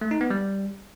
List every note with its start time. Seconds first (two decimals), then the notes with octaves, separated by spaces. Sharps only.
0.01 A3
0.11 D#4
0.21 B3
0.30 G3